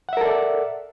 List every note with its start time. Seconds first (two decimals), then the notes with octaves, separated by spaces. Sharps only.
0.09 F#5
0.13 E5
0.17 A#4
0.21 A4
0.25 D5